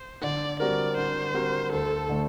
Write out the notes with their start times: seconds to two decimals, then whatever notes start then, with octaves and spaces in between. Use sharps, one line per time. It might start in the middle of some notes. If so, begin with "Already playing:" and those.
Already playing: C5
0.22 D3 D5
0.60 G3 C4 F#4 A#4 D5
0.97 D3 C5
1.34 G3 C4 F#4 A#4
1.72 D2 A4
2.09 D3 A3